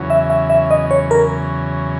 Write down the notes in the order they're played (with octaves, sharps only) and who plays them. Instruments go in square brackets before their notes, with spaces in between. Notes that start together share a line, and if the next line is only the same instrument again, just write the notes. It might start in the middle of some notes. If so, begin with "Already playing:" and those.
Already playing: [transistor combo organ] E2 C#3 F#3
[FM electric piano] E5
E5
E5
D#5
C#5
A#4